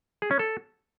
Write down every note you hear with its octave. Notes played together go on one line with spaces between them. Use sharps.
G#4
C#4
A4